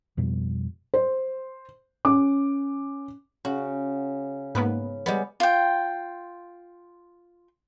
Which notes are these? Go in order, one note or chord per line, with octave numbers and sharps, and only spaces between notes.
F2 B2 F3 G3
C5
C#4 D6
C#3 F#4
G#2 A#3 B3 B4
G3 G#3 B3
F4 G5